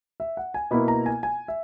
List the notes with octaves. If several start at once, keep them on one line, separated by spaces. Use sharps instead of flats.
E5
F#5
G#5
B2 A#3 E4 B5
A#5
G#5
G#5
E5